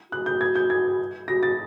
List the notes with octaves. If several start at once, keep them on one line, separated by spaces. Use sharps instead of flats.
F#4 F#6
G6
G#6
G6
G#6
F#4 A#6
A6